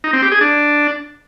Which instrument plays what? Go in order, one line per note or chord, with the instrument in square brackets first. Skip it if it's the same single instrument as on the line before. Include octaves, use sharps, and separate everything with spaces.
[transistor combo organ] D#4
C4
G4
G#4
D4